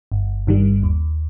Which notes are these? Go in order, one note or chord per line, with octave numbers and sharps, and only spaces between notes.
G1
G2 D#3 G3
D#2